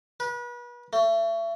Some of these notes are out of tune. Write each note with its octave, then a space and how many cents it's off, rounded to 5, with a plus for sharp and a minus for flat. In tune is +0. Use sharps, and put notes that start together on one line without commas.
B4 -35
A3 +30